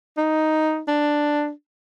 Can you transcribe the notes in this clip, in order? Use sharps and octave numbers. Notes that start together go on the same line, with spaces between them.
D#4
D4